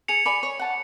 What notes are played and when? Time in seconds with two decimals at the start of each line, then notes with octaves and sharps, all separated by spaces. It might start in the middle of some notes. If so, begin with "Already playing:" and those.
0.08 G#4 C#7 F7
0.26 D5 G#5 B5
0.43 C#5
0.59 F#5 A5